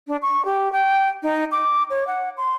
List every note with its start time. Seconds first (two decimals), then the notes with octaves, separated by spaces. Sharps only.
0.07 D4
0.22 C#6
0.45 G4
0.72 G5
1.23 D#4
1.52 D6
1.90 C#5
2.07 F#5
2.37 C6